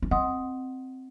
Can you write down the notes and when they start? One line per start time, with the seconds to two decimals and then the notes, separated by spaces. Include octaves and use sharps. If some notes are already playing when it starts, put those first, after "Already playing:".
0.02 C#4
0.11 C4 D#5 F#5 C6 D#6